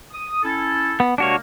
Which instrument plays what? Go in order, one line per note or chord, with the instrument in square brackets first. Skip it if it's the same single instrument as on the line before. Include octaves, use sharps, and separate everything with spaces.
[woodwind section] D#6
C#4 E4 A4
[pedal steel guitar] B3
[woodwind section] C3 G#3 A#3 [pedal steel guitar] D4 F#4 C#5